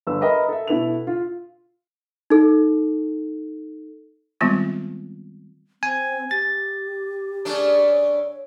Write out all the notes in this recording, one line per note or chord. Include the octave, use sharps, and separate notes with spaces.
G1 B4 E6
A#4 B4 D#5 E5 B5
A4 E5
B2 E4 A4 B4 F7
F4
D#4 A4
D#3 G3 G#3 B3 C4 F4
C4 G#5
G4 A6
C#3 A3 D4
C#5